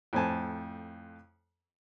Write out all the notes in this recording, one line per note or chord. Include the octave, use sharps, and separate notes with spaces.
F2 A2 C5 G#5 A5